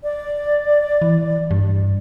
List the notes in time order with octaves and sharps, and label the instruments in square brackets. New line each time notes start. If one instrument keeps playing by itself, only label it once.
[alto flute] D5
[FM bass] E3
G2